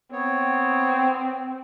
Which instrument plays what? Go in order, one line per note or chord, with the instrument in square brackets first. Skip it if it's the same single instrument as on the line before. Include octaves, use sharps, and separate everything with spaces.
[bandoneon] B3 C#5 [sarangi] C4